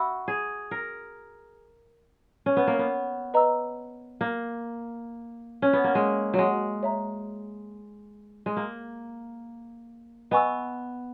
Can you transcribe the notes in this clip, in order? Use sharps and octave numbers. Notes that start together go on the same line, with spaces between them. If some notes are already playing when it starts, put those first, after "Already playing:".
Already playing: F#4 E5 B5 E6
G#4
A#4
C#4
B3
A#3
B3
B4 D#5 A#5 E6
A#3
C#4
B3
A#3
G#3
F#3 G#3
C#5 E5 A#5
G#3
A#3
B3 D#5 G#5 C#6 E6